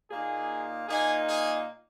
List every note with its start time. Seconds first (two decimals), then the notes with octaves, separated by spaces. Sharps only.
0.10 A#2 A#3 D#4 G#4
0.88 A#2 A#3 D#4 G#4
1.27 G#4